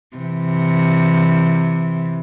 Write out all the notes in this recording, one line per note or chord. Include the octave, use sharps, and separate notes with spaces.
C3 E3